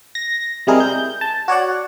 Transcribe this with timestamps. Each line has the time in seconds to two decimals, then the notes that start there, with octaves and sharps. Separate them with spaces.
0.15 A#6
0.67 C3 G3 G#3 E4 G#4 A#4
0.80 G6
1.21 A5
1.48 F#4 C#5 D5 F#5